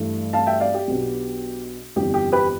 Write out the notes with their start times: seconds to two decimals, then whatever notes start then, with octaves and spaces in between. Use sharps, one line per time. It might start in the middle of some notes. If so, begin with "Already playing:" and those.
Already playing: G2 E3 A3
0.33 F5 A5
0.47 E5 G5
0.60 D5 F5
0.74 G4
0.88 B1 B2 B3 D4
1.96 G1 F2 E3 B3 D4 G4
2.14 G4
2.32 G4 B4